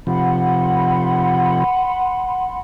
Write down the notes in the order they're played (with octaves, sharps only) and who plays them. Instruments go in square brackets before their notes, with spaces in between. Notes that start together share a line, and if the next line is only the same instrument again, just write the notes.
[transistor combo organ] C3 F3 [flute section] F#5 B5 C6